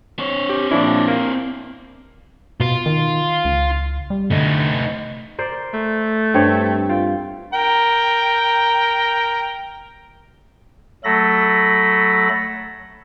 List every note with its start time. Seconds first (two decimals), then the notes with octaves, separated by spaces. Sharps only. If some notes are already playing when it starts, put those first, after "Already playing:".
0.19 C4 C#5
0.49 G4
0.71 A#2 F3 D4 E4
1.07 A#3
2.60 B2 F4
2.86 D#3
3.45 C#2
4.10 G3
4.31 D3 A3 D#4
5.38 A#4 C5 D5
5.74 A3
6.34 G2 C4 C#5
6.89 F4 G5
7.53 A#4 G5
11.04 F#3 A3 A4 B5 A#6